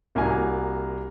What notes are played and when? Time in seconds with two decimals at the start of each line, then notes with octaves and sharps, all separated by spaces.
0.15 C2 A#3 F#4 G#5 A#5